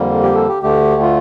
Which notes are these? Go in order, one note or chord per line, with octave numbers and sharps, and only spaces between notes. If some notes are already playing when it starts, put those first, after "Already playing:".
Already playing: F2 D3 G3 A#3
G4
A4
G4
D2 D3 A3 G4
F4